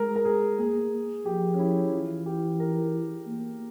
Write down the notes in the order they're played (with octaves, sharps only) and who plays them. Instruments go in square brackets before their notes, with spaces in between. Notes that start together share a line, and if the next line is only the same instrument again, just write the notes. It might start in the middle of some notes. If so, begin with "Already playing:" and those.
Already playing: [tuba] G#3 [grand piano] G#4 A#4
[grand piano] A#4
G#4
[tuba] A#3 [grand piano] G#4
[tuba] F3 [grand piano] G4
[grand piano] C#4
E4
[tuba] E3 [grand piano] F4
[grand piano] G4
A#4
[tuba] A#3